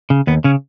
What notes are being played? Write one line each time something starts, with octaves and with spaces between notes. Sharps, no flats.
C#3
D#2 B3
C#3 C#4